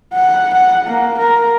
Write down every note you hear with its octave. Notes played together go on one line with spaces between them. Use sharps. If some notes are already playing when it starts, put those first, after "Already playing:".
F#5
F#5
A#3
A#4